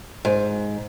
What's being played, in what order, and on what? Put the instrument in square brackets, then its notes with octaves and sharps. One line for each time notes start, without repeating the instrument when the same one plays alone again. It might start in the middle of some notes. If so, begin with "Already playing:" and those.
[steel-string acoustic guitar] G#2